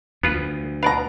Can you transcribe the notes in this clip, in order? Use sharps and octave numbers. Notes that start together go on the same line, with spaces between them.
D2 B3 F4 B4
B2 B4 D5 F5 A#5